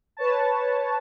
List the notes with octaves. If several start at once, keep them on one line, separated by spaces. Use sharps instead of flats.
B4 C#5 A5